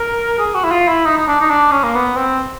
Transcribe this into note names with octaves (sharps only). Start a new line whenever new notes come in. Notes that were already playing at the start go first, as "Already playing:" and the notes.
Already playing: A#4
G#4
F#4
E4
F4
E4
D#4
D#4
D4
D#4
D4
C#4
A#3
B3
C4